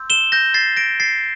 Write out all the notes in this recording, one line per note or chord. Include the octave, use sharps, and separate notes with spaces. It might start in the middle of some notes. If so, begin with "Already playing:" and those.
Already playing: C6 E6 G6
E7 G7
G6 A#6
A6 C7
A#6 D7
A6 C7